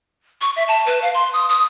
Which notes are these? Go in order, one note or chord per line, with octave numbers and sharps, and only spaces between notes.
C#6
E5
A5
B4
F5
C6
D#6
D#6